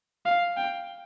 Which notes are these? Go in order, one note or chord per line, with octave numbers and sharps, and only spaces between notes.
F5
G5